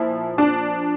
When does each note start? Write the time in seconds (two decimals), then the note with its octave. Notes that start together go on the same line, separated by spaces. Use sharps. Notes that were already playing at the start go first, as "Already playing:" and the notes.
Already playing: A#2 F3 E4
0.38 D4